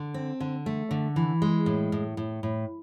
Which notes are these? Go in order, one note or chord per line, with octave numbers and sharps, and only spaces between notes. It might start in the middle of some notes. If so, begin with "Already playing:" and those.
Already playing: D3
C4
D3
A3
D3
E3
G#3
A2
A2
A2
A2